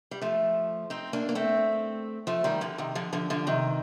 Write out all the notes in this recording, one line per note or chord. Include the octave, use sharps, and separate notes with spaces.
G3
F3 A3
C4 D#4
A#3 D4
A#3
A3 C4
F3 A3
D#3 G3
D3 F3
C3 D#3
D3 F3
D3 F3
D3 F3
C3 D#3